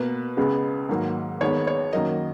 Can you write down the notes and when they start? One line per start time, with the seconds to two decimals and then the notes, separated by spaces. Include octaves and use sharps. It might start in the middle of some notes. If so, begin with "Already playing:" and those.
Already playing: B2 A#3 B4
0.37 C#2 C#3 G#3 B3
0.89 G#2 D#3 F#3 A#3
1.41 D#2 D#3 G#3 B3 C#5
1.67 C#5
1.93 F#2 D#3 F#3 A#3 D#5